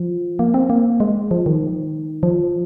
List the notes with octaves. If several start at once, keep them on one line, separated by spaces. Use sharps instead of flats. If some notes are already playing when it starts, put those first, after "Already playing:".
Already playing: F3
A#3
C4
A#3
G#3
F3
D#3
F3